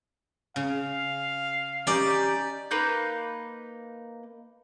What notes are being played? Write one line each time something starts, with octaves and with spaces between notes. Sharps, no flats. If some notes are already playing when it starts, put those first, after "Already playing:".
C#3 F5
C#4 D#4 G4 D5
A#3 D#4 B4 G6